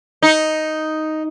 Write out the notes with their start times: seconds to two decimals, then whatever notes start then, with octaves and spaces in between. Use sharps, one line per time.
0.22 D#4